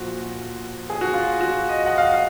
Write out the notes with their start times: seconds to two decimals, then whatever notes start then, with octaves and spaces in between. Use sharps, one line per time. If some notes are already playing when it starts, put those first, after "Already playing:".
Already playing: A#2 F3 F#4
0.90 G#4
1.01 F#4
1.13 F4
1.41 F#4
1.69 D#5
1.86 F#5
1.98 F5